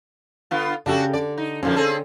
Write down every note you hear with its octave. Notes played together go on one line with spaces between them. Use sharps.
D3 B3 F4
C#3 D4 F#4 G4 A4
D3 D5
D#4
B2 D3 F3 A#3 C#4
C4 G#4 A4